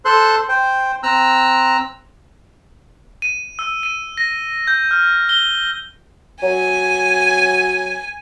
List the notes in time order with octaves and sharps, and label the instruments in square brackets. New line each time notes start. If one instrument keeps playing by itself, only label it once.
[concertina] A4 C5 C6 F#6
C5 G5
C4 A#5 E6 F#6
[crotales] D#7
E6
D#7
A#6
G6
F6
G7
[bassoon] F#3 [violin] G#5